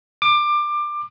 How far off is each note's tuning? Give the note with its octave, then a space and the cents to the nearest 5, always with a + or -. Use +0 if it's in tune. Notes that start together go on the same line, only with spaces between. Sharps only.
D6 +20